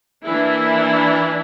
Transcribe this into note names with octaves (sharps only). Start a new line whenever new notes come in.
E3 A#3 D4 E4